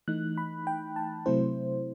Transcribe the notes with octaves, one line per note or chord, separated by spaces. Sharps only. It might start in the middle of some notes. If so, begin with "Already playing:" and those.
E3 A3 D#4 F#6
B5
G5
A5
C3 F#3 A3 C4 E4 C5